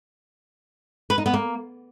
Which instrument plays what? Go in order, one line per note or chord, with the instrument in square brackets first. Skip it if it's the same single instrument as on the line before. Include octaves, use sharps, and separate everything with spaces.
[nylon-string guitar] B4
D#4
B3
A#3